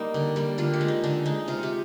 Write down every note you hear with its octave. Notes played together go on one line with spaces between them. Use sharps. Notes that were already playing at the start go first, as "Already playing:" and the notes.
Already playing: G3 A#3 D#4
D3
G3 A#3
D3 F4
G4
G#3
D#4
D3 D4
G#3 D#4
C3 F4
G4